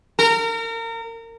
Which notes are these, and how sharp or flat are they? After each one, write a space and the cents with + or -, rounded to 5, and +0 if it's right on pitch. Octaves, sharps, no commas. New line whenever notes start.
A#4 -30